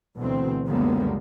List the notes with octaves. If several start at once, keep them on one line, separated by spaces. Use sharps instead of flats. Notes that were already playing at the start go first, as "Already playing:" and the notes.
D2 B2 E3 C4
C#2 F#2 D3 G3 A#3 B3